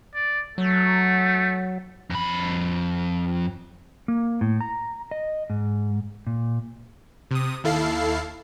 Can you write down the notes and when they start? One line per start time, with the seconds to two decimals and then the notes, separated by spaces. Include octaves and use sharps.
0.15 D5
0.58 F#3 A3
2.10 F2 B5
4.08 A#3
4.41 A2
4.61 A#5
5.11 D#5
5.50 G#2
6.27 A#2
7.31 C3 D#6
7.64 D#2 E4 A4 F5 C7